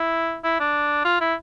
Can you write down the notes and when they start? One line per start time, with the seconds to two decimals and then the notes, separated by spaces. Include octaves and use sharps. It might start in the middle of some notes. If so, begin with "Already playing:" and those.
Already playing: E4
0.44 E4
0.60 D4
1.05 F4
1.21 E4